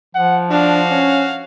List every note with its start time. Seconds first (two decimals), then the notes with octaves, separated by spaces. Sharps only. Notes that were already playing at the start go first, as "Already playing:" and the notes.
0.15 F3 F#5
0.50 D4 F#4 F5
0.91 C#4